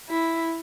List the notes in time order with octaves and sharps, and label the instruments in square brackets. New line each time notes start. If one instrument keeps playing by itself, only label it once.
[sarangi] E4